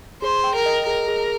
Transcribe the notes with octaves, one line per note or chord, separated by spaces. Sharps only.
G#4 C5
G5
A#4
D#5
G#4 A#4
G#4